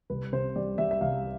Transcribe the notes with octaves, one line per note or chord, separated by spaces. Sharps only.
C2 B4
C3 C5
G3 D5
G3 E5
E5
C2 F5